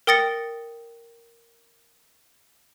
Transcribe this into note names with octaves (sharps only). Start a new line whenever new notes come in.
A#4 G5 D#6 A6 A#6 C#7